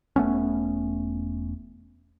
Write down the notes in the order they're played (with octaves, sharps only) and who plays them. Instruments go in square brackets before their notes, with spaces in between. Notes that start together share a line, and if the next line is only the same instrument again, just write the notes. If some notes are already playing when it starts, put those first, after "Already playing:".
[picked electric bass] E1 A3 B3 C#4